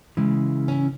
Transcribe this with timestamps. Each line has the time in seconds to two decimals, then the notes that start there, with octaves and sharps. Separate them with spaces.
0.17 C#3 E3 G#3
0.68 C#4 E4